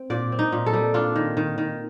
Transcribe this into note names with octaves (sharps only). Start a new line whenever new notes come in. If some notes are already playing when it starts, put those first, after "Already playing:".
Already playing: C4
A#2 D5
C4
D#4
A#2
A4
G3
D4 F4
D#3
D#3
D#3